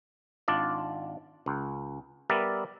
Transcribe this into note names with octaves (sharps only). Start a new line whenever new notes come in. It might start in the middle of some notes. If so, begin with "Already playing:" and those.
G#1 D4 F4 D5
C#2
G3 B3 A#4 D5 E5